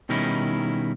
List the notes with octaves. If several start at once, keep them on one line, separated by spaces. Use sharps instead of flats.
B2 D#3 G3 C#4 D#4 E4